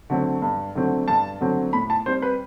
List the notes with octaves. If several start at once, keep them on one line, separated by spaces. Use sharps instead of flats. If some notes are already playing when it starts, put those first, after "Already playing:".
D3 F#3 A3 C4
G2
D3 F#3 A3 C4
G2 A5
D3 F#3 A3 C4
A2 B5
A5
G3 C4 C5
B4